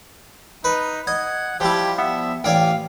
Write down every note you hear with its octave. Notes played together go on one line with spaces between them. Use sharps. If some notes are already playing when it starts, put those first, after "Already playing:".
D#4 B4
D#5 F#5 G#6
F3 G3 E4 G4
B3 E5
A1 D5 F5 G5 G#5